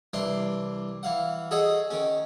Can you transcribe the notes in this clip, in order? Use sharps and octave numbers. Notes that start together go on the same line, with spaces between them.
C2 E3 D4 C6
E3 F5 F#5
G#4 A4 C#5 D#5 F#5 G#5
D#3 C#4